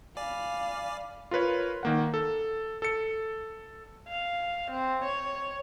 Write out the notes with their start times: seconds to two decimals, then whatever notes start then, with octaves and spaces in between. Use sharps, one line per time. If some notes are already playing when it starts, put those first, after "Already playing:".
0.17 D5 F5 G#5 B5 D6
1.31 F4 A#4 B4 C#5
1.83 D#3 A#3 F#5
2.14 A4
2.82 A4 C#7
4.08 F5
4.71 C4
5.04 C#5